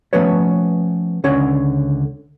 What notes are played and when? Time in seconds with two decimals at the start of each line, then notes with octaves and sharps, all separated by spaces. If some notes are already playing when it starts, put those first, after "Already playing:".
0.13 F3 A3 B3 C#4 B4 C#5
1.24 C#2 D3 C#4 C#5 F#5